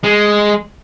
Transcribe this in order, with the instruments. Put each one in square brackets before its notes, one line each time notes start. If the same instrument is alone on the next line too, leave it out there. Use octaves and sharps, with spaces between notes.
[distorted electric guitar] G#3